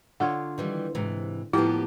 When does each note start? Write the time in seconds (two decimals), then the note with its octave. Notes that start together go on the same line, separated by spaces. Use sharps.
0.20 D3 F4 C#5 F#5
0.58 D#3 E3 G3
0.95 G#2 C3 E3
1.53 A2 F3 A#3 B3 E4 G4